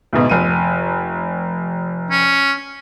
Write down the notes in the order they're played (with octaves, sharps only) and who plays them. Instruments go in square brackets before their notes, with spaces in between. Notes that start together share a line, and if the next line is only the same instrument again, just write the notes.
[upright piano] D2 G#2 B2
F1 D#7
[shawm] C#4